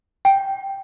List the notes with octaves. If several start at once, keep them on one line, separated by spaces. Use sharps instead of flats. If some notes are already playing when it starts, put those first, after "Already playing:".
G5